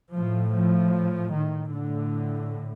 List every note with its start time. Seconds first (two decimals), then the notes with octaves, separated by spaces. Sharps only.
0.15 A2 F3
0.54 F3
1.34 D#3
1.74 A2 D3